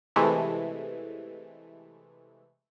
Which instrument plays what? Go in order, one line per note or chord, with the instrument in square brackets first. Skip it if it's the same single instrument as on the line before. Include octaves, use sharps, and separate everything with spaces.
[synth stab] C3 E3 G#3 A3